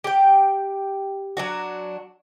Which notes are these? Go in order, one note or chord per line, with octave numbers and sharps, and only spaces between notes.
G4 G5
F#3 D4 F#4